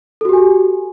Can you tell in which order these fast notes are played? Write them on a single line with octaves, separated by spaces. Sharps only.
A4 F#4 G4 G#5